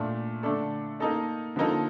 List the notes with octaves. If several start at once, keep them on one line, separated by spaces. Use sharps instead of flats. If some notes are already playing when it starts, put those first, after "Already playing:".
Already playing: A#2 A3 D4
D3 A3 D4 A4
A#3 D#4 A4 D#5
D3 F3 A#3 D#4 A4